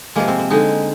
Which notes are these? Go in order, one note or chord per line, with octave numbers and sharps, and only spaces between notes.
C3 F3 G#3 A#3
C4
C4
D3 G#3 D#4